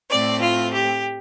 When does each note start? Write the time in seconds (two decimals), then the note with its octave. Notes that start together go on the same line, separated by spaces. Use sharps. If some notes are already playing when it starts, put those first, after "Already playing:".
0.10 A2 A3 C4 D5
0.42 F4
0.73 G4